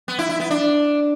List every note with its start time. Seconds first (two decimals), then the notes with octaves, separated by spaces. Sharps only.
0.08 B3
0.19 E4
0.29 E4
0.40 B3
0.50 D4